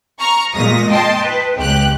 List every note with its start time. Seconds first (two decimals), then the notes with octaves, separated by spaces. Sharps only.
0.19 A#5 C#6 F6
0.53 A#2 G#3 D#6 A#6
0.90 D#5 G5 A5 C6
1.22 B4
1.56 C#2 G4 F#6